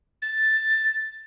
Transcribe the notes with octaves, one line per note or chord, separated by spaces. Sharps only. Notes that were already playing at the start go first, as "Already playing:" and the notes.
A6